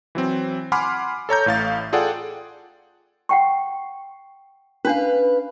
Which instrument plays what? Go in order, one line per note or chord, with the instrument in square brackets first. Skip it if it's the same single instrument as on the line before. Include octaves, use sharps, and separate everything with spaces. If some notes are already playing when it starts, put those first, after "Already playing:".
[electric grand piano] E3 F#3 C4
F#5 G#5 B5 C6 D6 F6
A4 C#5 A#5 G6
A1 A2 F5 A6
F4 G#4 A4 D5 F#5 G5
[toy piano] F#5 G5 C#6
[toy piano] C#4 D4 [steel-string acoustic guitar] B4 F5